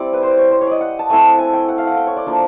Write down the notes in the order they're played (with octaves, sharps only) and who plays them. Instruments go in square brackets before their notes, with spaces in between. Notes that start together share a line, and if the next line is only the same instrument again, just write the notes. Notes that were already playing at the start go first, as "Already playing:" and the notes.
Already playing: [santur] G3 C4 E4 D5
B4
C5
C#5
C5
C#5
D5 D#5
F#5
A5
A3 C4 E4 G#5
A5
G#5
G5
F#5
F5
F#5
G5
C#5
D5
F3 A#3 D4